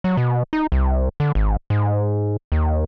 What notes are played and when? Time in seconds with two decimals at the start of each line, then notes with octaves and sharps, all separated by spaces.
0.04 F#3
0.17 B2
0.53 D#4
0.72 C2
1.20 D3
1.35 G#1
1.70 G#2
2.52 D#2